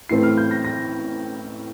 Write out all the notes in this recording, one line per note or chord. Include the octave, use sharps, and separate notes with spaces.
A2 E3 A3 C4 C7
F6
G6
A#6
A#6